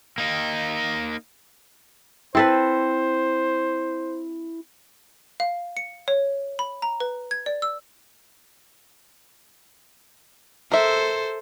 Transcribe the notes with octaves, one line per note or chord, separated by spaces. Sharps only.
A#3 D#4
C4 E4 A4 B4 C5
F5
C#7
C#5
B5
A#5
B4
G#6
D5
E6
A4 A#4 C5 E5